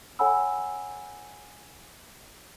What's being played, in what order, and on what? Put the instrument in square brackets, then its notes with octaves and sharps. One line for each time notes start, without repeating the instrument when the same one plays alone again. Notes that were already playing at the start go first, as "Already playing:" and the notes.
[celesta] A4 C#5 F#5 G#5 B5 E6